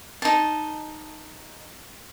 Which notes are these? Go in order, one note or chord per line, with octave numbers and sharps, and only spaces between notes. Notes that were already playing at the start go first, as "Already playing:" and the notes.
D#4 A5